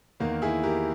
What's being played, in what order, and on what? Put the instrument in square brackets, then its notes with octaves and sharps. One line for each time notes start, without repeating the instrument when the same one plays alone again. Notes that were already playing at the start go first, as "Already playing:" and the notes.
[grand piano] E2 D#3 A#3
E4 G#4
G4 A#4